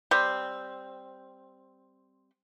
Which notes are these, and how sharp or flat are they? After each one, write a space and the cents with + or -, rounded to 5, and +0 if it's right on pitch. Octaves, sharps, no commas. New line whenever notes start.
G3 +0 C4 +0